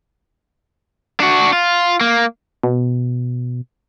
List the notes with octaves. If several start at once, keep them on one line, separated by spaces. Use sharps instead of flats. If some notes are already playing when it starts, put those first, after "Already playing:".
D4 F#4
F4
A#3
B2